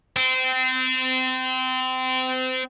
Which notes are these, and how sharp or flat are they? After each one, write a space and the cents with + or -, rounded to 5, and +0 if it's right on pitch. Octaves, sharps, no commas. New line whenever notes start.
C4 -25